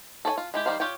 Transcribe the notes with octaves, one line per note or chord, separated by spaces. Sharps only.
A4 C#5 D5 G#5
F4
G#3 E4 G4
D#3 G3 C5 F5
F4 G4 C#5 G5